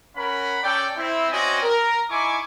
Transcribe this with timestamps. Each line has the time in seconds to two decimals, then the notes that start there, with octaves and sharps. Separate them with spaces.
0.16 C#4 A#4 F#5 B5
0.63 C#4 A4 D5 G5
0.97 C4 E4
1.31 C4 C#4 F#4 D5 D#5 G#5
1.62 A#4
2.09 D#4 E4 G#5 C#6 D6